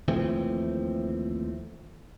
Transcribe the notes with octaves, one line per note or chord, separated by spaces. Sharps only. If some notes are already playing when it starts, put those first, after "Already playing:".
D#2 E3 F3 A3 C4